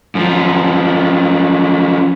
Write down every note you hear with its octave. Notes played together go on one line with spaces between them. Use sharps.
F#2 F3